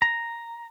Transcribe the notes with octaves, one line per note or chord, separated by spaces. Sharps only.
A#5